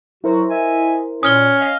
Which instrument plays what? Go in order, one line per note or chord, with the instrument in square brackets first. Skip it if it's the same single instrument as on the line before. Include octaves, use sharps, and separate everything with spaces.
[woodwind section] F#3 F#4 [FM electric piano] E4 A#4 C5
[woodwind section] D#5 E5 G#5
[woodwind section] A#2 [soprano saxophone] C#4 [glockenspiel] D#6 F6 G7
[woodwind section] D#5 F5